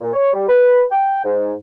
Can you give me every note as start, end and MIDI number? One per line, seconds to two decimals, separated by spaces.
0.01 0.11 46
0.13 0.31 73
0.33 0.46 55
0.48 0.82 71
0.91 1.24 79
1.24 1.52 44